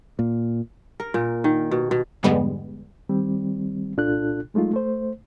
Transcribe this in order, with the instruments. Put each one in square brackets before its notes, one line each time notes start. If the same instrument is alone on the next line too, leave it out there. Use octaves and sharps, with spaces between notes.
[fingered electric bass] A#2
[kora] A#4
A#2
D#3
B2
B2
[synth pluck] F2 G#2 D3 G3 G#3 B3
[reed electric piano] D#3 G3 C4
C2 A#2 D4 F4 A4 F#6
F#3 G#3 A3 D#4 F4
A3 C5